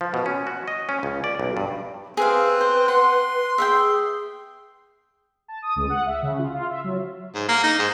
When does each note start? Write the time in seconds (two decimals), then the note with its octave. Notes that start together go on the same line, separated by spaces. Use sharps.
0.01 F3
0.14 B2
0.26 C#4
0.47 F#4
0.68 D#5
0.89 C#4
1.03 C#2
1.24 D5
1.40 B1
1.57 G2
2.17 C4 G#4 B4 E5 F5
2.61 C5
2.88 F#5 C6
3.58 G#4 E5 F#5 G5
5.48 A5
5.62 D#6
5.76 C#2
5.90 F#5
6.06 E5
6.22 C#3
6.39 F4
6.53 F4
6.69 E5
6.84 F#3
7.35 G#2
7.49 A#3
7.63 D#4
7.79 G#2